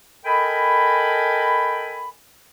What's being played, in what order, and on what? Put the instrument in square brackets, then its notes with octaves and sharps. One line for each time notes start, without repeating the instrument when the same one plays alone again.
[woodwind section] A4 A#4 D#5 G5 G#5 B5